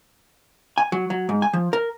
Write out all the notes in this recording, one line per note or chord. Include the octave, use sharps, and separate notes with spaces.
G#5
F#3
F#3
G#2
G#5
F3
A#4